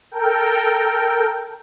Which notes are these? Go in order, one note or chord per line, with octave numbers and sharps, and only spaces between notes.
A4 A#4 G5